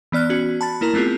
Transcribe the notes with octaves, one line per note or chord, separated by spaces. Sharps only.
E3 B3 D5 F6 F#6
B3 C#4 F#4
A5 B5 A6
A#3 E4 A#4 A#5
A3 B3 C4 F4 G#4